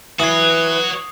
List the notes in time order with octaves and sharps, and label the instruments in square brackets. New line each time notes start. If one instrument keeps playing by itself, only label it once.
[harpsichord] E3 [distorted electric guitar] F#4 C#5 [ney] B4 [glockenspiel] D#6 C7